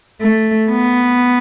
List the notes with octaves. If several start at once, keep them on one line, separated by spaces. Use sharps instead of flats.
A3
B3